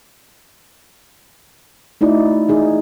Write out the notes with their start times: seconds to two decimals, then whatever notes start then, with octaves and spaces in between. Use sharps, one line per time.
2.01 A3 D#4 E4 F#4 D5
2.48 E3 D#4 G#4